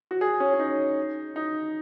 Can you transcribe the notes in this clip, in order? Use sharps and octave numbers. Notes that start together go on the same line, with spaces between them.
F#4
G#4
C#4
C#4
D#4
D#4